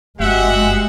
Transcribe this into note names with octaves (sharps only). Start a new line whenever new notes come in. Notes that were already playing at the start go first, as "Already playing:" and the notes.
F#1 G2 G#3 C4 F#4 G4 E5 F#5